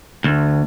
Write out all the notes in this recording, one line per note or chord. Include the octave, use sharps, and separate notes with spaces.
D2